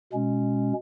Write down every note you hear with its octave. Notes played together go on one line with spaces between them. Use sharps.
B2 G#3 C#4